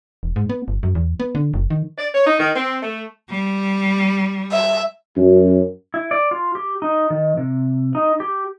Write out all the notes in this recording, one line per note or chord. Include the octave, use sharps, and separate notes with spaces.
E1
G#2
B3
G1
F#2
E2
B3
D3
F#1
D#3
D5
C#5
D#4
D#3
C4
A3
G3
E5
F#2
E4
D5
F4
G4
D#4
D#3
C3
D#4
G4